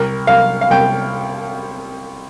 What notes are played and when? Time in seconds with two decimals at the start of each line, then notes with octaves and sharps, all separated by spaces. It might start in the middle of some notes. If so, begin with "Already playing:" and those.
Already playing: C2 A#4
0.27 C2 F5
0.61 F5
0.70 C2 G5